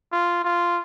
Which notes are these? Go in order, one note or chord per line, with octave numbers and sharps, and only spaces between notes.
F4
F4